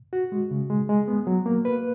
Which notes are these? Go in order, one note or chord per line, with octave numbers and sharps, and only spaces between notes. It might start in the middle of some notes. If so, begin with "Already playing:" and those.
F#4
G#3
C#3
G#3
G#3
B3
F#3
A#3
B4